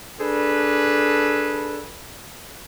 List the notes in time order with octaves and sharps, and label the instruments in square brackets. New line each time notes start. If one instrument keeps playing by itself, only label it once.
[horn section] D4 G#4 A4 B4